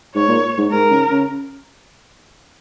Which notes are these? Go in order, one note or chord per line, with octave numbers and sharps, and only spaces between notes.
G#2 C#5
A#2
G#2
G#2 A#4
C#3
C#3